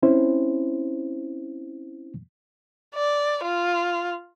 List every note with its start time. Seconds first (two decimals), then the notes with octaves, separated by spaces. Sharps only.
0.03 C4 C#4 E4 C5
2.95 D5
3.44 F4